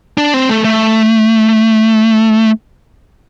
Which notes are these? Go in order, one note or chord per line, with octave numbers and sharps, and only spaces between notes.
D4
C4
A3
A3